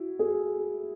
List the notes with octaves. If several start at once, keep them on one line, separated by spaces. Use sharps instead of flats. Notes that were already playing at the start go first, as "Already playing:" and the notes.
Already playing: E4 F#4
F#4 G#4